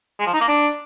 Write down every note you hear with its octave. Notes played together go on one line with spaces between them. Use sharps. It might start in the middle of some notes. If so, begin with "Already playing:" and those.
G#3
F3
D#4
A#3
D4